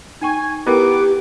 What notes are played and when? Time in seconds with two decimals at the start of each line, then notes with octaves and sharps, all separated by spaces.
0.21 D#4 G5 G#5 C#6
0.66 B3 E4 G4 A#4 G5 D6